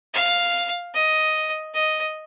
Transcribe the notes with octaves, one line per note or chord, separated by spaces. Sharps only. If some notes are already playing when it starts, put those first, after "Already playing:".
F5
D#5
D#5